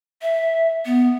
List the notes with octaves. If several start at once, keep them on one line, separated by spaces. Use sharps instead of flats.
E5
B3